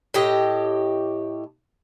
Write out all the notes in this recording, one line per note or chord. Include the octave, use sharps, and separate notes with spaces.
A2 G4 D#5